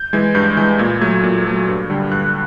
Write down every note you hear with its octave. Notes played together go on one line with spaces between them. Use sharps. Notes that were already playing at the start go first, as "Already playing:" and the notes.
Already playing: G6
E3 G#3 G#6
G2 G6
E3 G#3 G6
A#2 G#6
F#3 A3 G#6
A#2
F#3 A3
G2
D3 G3
G2 F#6